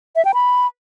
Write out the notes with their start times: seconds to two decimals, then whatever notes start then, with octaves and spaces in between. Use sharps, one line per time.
0.16 E5
0.25 G5
0.34 B5